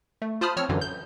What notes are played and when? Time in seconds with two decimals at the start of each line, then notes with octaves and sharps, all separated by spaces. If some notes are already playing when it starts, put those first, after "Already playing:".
0.22 A3
0.41 F4 C5 A5 B5 D#6 F6
0.57 F3 C4 C#5 E6 F6
0.69 F#2 D3 E3 F#3
0.81 G6